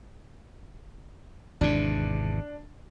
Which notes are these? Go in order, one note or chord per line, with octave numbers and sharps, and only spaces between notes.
G#1 E2 C3 D4